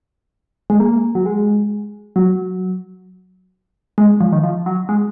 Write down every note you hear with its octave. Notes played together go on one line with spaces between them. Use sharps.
G#3
A#3
F#3
G#3
F#3
G#3
F3
D#3
F3
F#3
G#3